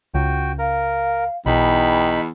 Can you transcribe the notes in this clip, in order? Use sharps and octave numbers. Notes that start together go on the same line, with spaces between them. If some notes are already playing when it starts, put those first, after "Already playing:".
C#2 F#4 G5
A#4 F5
B1 E2 D#4 G5 B5